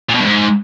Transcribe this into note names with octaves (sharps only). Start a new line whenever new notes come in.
A#2
B2
G2
G#2